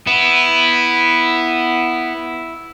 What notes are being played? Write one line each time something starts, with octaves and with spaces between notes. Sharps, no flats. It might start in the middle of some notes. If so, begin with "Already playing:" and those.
B3 E4